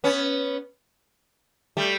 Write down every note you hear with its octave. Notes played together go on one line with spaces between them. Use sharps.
B3 C#4
G3 A3